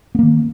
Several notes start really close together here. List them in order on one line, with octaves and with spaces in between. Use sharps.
B3 A#3 D#3